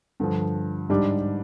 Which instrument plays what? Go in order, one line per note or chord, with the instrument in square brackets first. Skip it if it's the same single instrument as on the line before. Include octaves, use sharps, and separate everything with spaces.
[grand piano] G2 D3 F3
G#2 G3 D4 G4